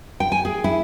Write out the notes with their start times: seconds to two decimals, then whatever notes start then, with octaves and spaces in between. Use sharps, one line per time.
0.20 G5
0.32 G#5
0.45 G#4
0.64 E4